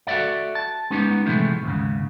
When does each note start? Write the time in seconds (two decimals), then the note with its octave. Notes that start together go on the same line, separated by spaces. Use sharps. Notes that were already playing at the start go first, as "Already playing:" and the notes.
0.07 F#4 A4 A#4 D5 E5
0.55 A5
0.90 G#3 B3 C#4 D#4 G4
1.26 A2 C3 E3 F3 G#3 A3
1.63 D#2 G#2 C#3